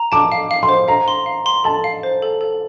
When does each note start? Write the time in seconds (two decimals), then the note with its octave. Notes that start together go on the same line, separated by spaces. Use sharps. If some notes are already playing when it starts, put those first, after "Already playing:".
Already playing: A#5
0.12 A5 D6
0.32 F5
0.51 F5
0.63 C6
0.69 C5
0.88 F5 A#5
1.08 C6
1.26 F5
1.46 C6
1.64 A4 A5
1.84 F5
2.03 C5
2.22 A4
2.41 A4